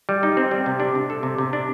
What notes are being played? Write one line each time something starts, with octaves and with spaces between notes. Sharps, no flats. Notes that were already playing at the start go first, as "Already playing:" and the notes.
G3
D#4
C4
G3
C3
D4
C3
A4
C3
C3
D4